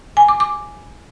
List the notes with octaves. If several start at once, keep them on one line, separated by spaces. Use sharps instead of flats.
G#5
D6
D6